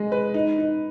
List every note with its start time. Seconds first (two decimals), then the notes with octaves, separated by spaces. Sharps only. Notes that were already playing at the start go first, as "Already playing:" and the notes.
Already playing: G#3 D#5
0.12 B4
0.34 D#4
0.58 D#4